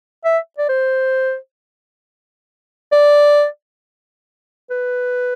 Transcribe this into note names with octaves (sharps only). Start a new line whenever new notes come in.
E5
D5
C5
D5
B4